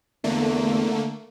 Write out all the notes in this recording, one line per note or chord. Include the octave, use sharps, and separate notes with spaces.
E2 D3 A3 A#3